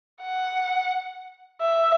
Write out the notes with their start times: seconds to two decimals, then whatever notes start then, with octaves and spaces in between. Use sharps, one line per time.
0.22 F#5
1.61 E5